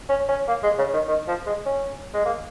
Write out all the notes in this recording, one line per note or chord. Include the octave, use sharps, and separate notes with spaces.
C#4
C#4
A#3
G#3
C#3
D#3
D#3
F3
G#3
C#4
G#3
A#3